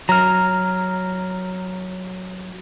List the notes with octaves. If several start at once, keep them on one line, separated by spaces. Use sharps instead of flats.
F#3 A#5 F6